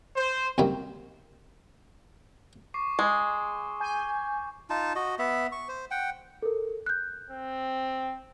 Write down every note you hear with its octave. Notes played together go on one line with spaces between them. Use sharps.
C5
D#2 C3 F#3 G3 A#3
C#6 D6 C7
G#3
G#5 G6
D#4 F4 A5
F#4 D#5
B3 E5
C#6
C5
F#5 G5
A4 A#4
F#6 G6
C4